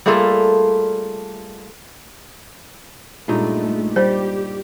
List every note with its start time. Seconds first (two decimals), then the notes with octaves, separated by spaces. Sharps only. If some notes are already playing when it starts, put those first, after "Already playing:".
0.06 G3 A3 A#3 F4 G#4 A4
3.28 G2 A#2 G#3 A3 D#4
3.96 G3 G4 C5